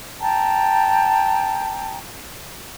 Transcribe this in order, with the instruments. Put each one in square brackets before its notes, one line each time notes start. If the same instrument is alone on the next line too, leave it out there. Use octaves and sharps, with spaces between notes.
[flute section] G5 A5 A#5